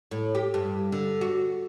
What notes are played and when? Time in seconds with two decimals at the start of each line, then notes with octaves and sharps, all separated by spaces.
0.11 A2
0.35 G4
0.54 G2
0.92 D3
1.21 F#4